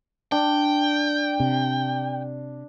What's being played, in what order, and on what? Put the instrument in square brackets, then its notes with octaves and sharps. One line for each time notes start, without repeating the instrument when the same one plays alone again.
[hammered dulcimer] D4 [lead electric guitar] G5
[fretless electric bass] C3